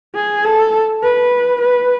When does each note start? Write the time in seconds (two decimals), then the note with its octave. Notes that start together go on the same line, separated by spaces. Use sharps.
0.15 G#4
0.45 A4
1.03 B4
1.62 B4